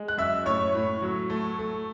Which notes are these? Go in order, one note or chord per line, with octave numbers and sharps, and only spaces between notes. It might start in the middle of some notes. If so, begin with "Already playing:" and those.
Already playing: G#3
F#6
F#2 E5 E6
A2 C#5 C#6
A2
F#3
A3
A3